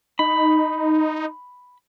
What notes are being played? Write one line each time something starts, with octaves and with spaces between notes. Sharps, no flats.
D#4 B5